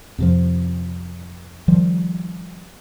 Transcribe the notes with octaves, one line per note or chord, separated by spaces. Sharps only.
F2 C3 F3
D#3 F3 G3